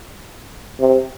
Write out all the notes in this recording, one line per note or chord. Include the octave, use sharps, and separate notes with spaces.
C3